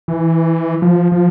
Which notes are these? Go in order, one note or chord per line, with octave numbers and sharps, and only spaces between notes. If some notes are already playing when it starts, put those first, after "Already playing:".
E3
F3
F3